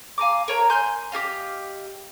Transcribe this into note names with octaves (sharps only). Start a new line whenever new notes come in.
F5 G#5 A#5 D6
A#4 C#5 A#5
G#5 C6 G6
G4 G#4 D#5 F5